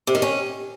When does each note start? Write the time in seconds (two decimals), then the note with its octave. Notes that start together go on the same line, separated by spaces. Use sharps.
0.07 C3
0.15 D#3
0.22 C#4